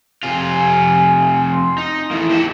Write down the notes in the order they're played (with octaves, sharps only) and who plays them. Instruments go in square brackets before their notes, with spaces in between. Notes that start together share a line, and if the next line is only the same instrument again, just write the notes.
[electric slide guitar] F2 C3 F4 [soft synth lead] G#5
[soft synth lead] C6
[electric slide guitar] D#4
[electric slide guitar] A2 E3 A#3 [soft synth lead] E4
[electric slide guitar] A#3 G4 A5